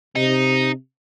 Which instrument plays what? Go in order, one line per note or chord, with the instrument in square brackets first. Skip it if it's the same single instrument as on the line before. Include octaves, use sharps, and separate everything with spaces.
[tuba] C3 [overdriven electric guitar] D#4